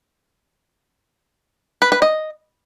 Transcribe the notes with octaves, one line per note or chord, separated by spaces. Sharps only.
B4
B4
D#5